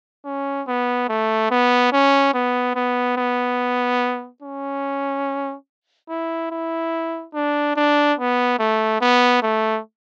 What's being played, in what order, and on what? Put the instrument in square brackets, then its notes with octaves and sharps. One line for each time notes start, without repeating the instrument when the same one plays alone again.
[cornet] C#4
B3
A3
B3
C#4
B3
B3
B3
C#4
E4
E4
D4
D4
B3
A3
B3
A3